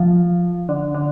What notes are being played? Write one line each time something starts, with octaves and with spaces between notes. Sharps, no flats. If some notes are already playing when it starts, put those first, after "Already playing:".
Already playing: F3
D3
D3